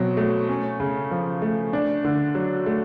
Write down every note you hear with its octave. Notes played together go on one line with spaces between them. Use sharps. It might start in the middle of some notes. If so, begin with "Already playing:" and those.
Already playing: B2 F#3 C4
A3
C#4
C#3
F3
A3
D4
D3
F#3
A3